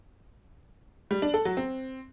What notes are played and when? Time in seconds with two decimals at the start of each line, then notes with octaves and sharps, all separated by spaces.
1.11 G3
1.22 D4
1.34 A4
1.45 F#3
1.57 C4